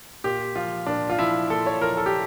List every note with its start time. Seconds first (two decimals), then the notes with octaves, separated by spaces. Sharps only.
0.24 A#2 G4
0.56 F3 F4
0.86 A#2 D4
1.10 F4
1.19 F3 E4
1.50 A#2 A4
1.66 C#5
1.81 F3 A#4
1.97 A4
2.06 G4